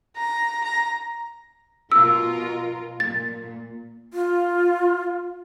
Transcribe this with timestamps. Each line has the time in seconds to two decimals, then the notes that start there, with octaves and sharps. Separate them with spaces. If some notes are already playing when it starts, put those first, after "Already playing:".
0.17 A#5
0.64 A#5
1.92 B2 F4 A#4 E6
3.00 A#2 A6
4.14 F4